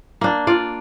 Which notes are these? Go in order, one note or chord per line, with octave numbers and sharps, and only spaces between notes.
A#3 D4
F4 D5